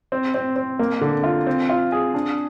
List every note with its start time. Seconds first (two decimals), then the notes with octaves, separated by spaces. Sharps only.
0.12 C4
0.34 C4
0.56 C4
0.79 A#3
1.01 D3
1.24 F4
1.47 C4
1.69 F4
1.92 G#4
2.14 D4